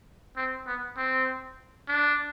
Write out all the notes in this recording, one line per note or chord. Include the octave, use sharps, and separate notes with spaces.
C4
B3
C4
D4